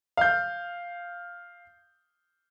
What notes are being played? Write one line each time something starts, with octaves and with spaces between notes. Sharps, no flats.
F5 G6